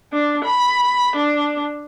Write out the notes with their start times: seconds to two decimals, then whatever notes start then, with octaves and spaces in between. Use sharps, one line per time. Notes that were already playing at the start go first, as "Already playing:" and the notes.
0.13 D4
0.45 B5
1.16 D4